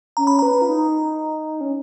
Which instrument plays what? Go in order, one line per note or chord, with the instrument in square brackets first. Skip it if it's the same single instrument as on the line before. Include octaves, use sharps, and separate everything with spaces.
[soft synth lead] C#4 [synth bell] A#5
[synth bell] B5
[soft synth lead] B4 [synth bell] A#5
[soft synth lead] F4
D#4
C#4